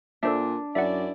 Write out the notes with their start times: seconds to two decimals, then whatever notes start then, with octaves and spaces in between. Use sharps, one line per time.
0.23 A#2 D4 A4 C5 E5
0.75 F#2 E4 D5 E5 F#5